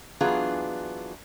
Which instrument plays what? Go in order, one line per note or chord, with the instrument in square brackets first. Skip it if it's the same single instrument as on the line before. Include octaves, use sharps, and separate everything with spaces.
[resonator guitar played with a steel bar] E3 F#3 B3 D4 F4 G#4